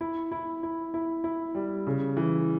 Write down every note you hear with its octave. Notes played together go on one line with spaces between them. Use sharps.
E4
E4
E4
E4
E4
G3
C#3
E3